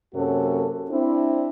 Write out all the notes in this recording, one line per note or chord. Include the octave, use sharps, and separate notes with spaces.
F#2 C3 A#3 C#4 F#4 A4
C4 D4 E4